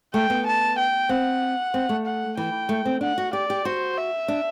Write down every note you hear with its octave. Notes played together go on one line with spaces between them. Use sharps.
A3 G5
B3
A5
G5
C4 F#5
C4
A3
F#5
E3 G5
A3
C4
D4 F#5
F#4
G4 D5
G4
F#4 C5
E5
D4